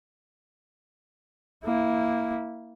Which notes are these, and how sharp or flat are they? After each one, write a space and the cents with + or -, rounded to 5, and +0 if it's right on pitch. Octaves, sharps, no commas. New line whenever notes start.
A#3 +0 E4 -15